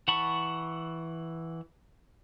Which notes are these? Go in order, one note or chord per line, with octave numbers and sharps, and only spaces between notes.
E3 F#5 A5 B5 C#6